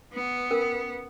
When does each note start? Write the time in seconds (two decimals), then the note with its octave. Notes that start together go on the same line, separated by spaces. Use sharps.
0.12 B3
0.51 C#4 A#4